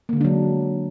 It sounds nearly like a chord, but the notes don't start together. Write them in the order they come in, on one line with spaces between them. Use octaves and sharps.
A#3 D3 G#3 D4 F#3